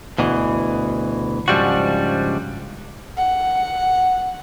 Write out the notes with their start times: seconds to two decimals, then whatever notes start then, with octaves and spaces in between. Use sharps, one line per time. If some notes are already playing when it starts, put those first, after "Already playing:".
0.18 D2 B2 E3
1.48 G#2 C#3 F3 G3 D4 F#4
3.17 F#5